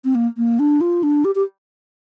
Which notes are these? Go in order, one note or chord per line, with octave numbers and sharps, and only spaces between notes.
C4
A#3
A#3
D4
F4
D4
G4
G4